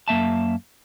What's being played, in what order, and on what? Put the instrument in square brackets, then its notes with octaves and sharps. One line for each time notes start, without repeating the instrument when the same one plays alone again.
[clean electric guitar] F#2 A#3 E5 A5